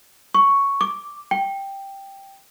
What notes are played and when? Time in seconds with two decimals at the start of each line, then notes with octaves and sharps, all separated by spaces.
0.34 C#6
0.81 D6
1.31 G5